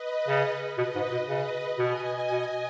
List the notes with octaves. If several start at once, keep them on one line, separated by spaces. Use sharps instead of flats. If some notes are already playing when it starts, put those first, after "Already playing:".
Already playing: B4 D#5
C#3
B2 B4 D#5
G#2
B2
C#3 B4 D#5
B2 D#5 G#5
B2